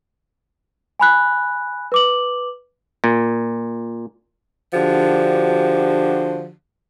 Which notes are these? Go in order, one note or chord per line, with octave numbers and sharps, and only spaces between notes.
G#5 B5 F#6
B4 D6 F#7
A#2
D3 F3 D4 F#4 G4